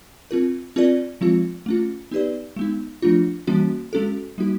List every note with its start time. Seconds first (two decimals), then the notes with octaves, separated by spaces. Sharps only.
0.31 C4 F4 A#4
0.76 C4 F4 A#4 D5
1.21 F3 G#3 C4 F4
1.66 A3 C#4 F4
2.11 B3 D#4 G4 B4 D5
2.56 G#3 B3 D#4
3.02 F3 A3 D4 F4
3.47 E3 G3 A#3 C#4 F#4
3.93 G#3 C#4 F#4 A4
4.38 G3 A#3 D#4 F#4